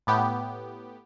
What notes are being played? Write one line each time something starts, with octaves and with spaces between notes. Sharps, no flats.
A2 B3 G4